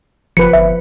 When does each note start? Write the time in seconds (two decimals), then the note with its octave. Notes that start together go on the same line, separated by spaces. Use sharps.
0.37 F#1 F3 B4 C#7
0.53 G1 E5